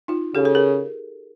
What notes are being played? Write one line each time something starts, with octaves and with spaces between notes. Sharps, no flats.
D#4 F4
C#3 G4 A4
A4
G#4 A#4